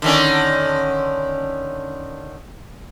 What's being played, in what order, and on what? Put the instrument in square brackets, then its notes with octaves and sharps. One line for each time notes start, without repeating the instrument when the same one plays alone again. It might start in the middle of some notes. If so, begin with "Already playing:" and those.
[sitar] D3 D#3 C#4